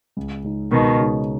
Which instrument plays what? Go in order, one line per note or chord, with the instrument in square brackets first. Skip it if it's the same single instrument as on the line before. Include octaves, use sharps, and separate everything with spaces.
[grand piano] C#2
C#3 G#3 D#4
[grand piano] C#2 [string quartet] B2 D#3
[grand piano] C#3 G#3 D#4